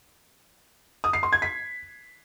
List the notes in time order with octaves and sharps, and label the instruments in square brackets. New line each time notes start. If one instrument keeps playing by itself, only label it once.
[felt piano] D#6
C7
C6
G#6
B6